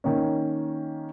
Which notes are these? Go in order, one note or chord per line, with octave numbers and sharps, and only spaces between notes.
D#3 A#3 C#4